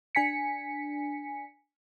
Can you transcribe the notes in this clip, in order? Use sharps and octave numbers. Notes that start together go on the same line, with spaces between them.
D4 G#5 B6 C#7